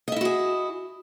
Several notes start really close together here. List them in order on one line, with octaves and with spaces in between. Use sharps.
D#5 E5 E4 F#4 G#4